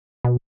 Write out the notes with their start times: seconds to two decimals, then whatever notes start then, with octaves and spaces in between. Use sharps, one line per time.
0.24 B2